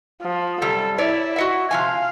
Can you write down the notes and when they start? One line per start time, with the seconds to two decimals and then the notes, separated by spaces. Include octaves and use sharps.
0.22 F3
0.62 F#2 C3 G3 A4
0.98 E4 C#5 D5 E5
1.36 F#4 D#5 E5
1.71 C3 F3 F5 G#5